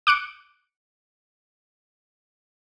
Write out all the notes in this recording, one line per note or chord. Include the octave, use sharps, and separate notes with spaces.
D6 F#6 C#7 D7